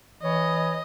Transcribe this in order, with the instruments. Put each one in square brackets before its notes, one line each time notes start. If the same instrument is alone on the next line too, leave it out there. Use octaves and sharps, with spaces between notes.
[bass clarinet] E3 [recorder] C#5 [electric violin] D#5